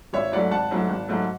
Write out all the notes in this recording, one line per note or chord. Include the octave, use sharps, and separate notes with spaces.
G#1 C#5 E5
G#2 F#3 A3 D5 F#5
G#1 F#5 A5
G#2 F#3 A3
G#1
G#2 F#3 A3